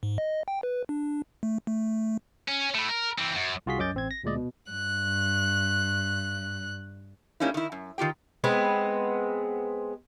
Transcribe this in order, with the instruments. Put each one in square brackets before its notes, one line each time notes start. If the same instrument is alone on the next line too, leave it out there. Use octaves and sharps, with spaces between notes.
[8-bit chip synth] G#2
D#5
G5
B4
D4
A3
A3
[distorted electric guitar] C#4
A3 E4
A#4
E3 C4
F#2
[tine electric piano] C2 F4 F#4 G#4 C6 B6
F#2 C#4 D#5 D6 G6 A6
A1 C4 G#6
A#6
D2 A#2 G#3 D5 D#5
B2
[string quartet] G2 F#6
[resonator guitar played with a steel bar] G3 A#3 C#4 D#4 E4
D#3 E4
F#2
D#3 F4 G4 G5
[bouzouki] G#3 B3 C4